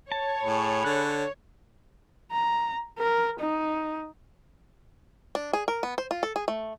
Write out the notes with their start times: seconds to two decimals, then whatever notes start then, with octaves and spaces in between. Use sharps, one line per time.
0.12 C#5 A5
0.43 A2 G#4 B5
0.84 D3 F#6
2.32 A#5
2.99 A#4
3.40 D#4
5.35 D4
5.53 G#4
5.68 A#4
5.83 B3
5.98 C5
6.11 F4
6.23 A4
6.36 G#4
6.48 A3